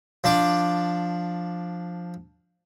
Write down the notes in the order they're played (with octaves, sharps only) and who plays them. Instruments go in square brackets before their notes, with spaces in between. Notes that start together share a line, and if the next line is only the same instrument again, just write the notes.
[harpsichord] F3 D4 D5 D6